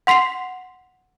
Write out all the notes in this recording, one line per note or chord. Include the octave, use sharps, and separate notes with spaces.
F#5 C6 B6 C7 F7